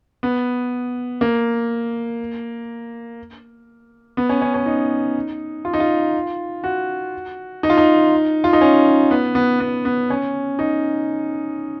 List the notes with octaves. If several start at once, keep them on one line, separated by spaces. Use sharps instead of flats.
B3
A#3
B3
C#4
C#4
C#4
D#4
F4
D#4
F4
F#4
D#4
F4
D#4
F4
D#4
C#4
B3
B3
B3
B3
C#4
D#4